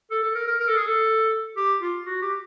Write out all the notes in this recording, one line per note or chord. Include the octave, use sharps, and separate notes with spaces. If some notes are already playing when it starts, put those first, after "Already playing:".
A4
A4
A#4
A#4
A#4
A4
G#4
A4
G4
F4
F#4
G4